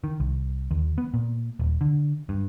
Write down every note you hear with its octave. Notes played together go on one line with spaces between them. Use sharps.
D#3
C2
D#2
B3
A#2
D#1
D3
G2